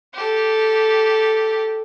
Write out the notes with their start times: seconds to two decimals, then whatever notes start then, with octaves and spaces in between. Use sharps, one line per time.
0.13 G4 A4